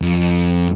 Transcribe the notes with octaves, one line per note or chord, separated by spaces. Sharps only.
F2